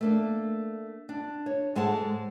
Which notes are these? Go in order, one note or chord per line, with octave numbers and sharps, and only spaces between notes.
A3 A#3 D4
D4
C#5
G#2 G#3 A4 F#5 A5